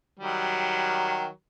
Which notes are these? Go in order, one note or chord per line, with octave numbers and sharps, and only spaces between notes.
D#3 F#3 G3